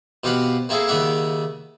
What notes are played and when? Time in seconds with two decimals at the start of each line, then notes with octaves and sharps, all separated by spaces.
0.24 B2 C4 G4 F5 F#5 B5
0.69 A#3 C4 E4 G#4 A4
0.88 D#2 C#3 D5 E5 F#5